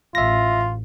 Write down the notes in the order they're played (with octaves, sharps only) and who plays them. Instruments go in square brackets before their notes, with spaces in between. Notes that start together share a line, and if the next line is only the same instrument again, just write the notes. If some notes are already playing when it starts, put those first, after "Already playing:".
[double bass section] A1 [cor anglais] F4 [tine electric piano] E5 A#6